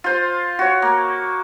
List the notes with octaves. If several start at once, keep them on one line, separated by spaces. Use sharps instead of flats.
F4 C5
F#4 C#5
A#3